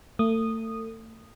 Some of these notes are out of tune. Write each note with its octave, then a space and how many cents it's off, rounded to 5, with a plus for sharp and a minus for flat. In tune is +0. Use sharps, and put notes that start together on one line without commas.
A3 +35 D#6 -10